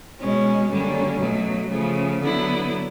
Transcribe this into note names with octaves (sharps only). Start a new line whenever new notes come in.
B2 G#3 C#4
F#2 D3 G3 A#3 C#4
B2 F#3 A3
C#3 F3 A3
D3 F#3 B3 E4